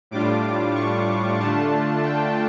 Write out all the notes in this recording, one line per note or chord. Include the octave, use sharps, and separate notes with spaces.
A2 G3 D4 F4 D6
C#6
D3 A3 D4 F4 A5
G5